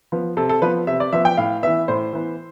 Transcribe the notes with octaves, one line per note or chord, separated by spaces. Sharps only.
F3 B3
C3 A4
A4
F3 B3 B4
C3 E5
D5
F3 B3 E5
G5
A2 F5
E3 B3 E5
A2 C5
E3 B3